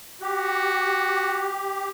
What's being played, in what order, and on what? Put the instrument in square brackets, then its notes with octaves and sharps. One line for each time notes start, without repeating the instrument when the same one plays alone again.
[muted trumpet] F#4 [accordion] G4